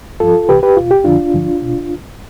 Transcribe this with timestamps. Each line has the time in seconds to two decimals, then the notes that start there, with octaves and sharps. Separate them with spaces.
0.20 G2 F3 F4 A4
0.49 C2 C3 E3 G4 B4
0.63 G4 B4
0.77 E2 B2 F4
0.91 G4
1.04 F2 D3 F3 D4 F4
1.33 G2 D3 F3
1.62 B2